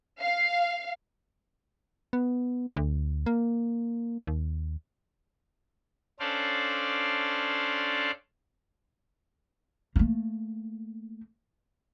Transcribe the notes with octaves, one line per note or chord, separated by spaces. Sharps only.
F5
B3
D2
A#3
D#2
C#4 D4 A4 C5 D5 F5
A3 A#3